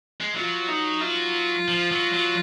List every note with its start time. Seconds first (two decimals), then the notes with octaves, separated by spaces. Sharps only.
0.21 G#3
0.34 F#3 F4
0.68 D#4
1.01 F4
1.68 F3
1.91 F#3
2.14 F#3